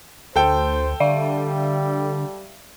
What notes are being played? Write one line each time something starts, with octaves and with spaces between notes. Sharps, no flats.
D2 A4 C5 G5
D3 G3 D5 E5 F5